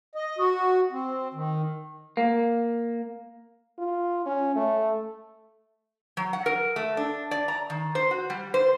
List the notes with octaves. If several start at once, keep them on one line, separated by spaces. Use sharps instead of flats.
D#5
F#4
C4
D#3
A#3
F4
C#4
A3
F#3
F#5
A#4
A3
D4
D5
A#5
D#3
C5
F#4
G3
C5